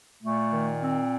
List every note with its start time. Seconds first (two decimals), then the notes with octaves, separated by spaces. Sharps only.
0.22 A#2 A3
0.52 D#3
0.81 C4